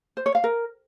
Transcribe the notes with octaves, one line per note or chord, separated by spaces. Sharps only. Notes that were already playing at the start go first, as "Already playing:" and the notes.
C5
C#5
F5
A#4